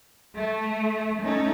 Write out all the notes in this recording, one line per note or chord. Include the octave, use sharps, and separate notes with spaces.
A3
A3 C#4 D#4 A4